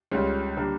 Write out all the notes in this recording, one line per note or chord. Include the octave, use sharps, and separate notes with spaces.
C#2 C#3 G3 C#4 F4
D3 G3 A#3